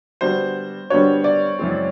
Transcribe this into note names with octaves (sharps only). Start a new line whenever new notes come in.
D3 G3 B3 D4 F#4 C5
D3 G3 B3 D4 F#4 C#5
D5
F#2 C#3 E3 G#3 C4